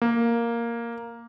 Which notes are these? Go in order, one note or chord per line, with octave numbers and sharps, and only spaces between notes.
A#3